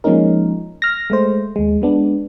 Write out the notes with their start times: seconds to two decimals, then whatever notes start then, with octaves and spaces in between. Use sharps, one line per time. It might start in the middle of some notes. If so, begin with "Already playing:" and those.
0.04 F3 G#3 A#3 C#4 D#4 A#4
0.82 F6 A#6
1.10 G#3 A3 C5
1.56 D#2 G#3
1.82 G#3 B3 D4